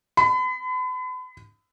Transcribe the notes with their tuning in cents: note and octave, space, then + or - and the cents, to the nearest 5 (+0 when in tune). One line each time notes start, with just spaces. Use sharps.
B5 +40